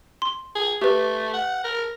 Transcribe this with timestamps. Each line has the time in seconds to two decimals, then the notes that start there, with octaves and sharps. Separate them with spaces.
0.22 C6
0.56 G#4
0.81 A3 G4 B4
1.34 F#5
1.64 A#4